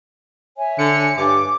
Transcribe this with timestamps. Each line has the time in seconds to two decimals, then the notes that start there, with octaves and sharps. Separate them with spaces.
0.58 C#5 E5 G#5
0.79 D3 C#7
1.18 G2 D6